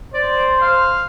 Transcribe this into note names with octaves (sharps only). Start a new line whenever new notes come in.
C5 D5
F5